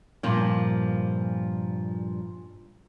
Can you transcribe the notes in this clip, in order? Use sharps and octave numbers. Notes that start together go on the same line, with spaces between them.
G2 A#2 F3 A#3